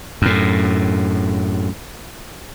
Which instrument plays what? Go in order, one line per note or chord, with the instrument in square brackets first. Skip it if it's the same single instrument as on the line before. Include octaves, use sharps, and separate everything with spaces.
[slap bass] F#2 A2